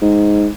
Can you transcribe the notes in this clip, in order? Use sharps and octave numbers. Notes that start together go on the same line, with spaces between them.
G#2